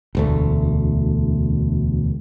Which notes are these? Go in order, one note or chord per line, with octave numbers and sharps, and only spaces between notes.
E1 D2 A3